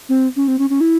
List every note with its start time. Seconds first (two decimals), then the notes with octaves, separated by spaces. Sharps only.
0.09 C4
0.36 C#4
0.48 C4
0.59 C#4
0.70 C#4
0.81 E4